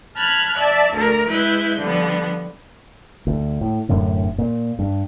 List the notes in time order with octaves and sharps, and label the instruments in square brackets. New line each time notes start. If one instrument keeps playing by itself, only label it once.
[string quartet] A5 B5 F6 F#6 G#6
D5 E5 A5
D2 D3 A3 A#4
G#3 E4 B4 E5 G6
D3 F3 G3 B3
[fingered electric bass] D2
A2
D1 F#2 A2 D3
A#2
G2